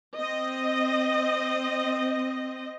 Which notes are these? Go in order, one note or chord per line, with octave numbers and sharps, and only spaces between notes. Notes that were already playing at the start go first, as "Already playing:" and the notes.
C4 D#5